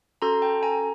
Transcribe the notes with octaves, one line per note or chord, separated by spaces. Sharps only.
C#4 F#4 A4 A#5 C6
G5 A5
G#5 A#5